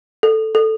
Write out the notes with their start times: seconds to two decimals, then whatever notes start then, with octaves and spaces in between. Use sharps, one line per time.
0.23 A4
0.55 A4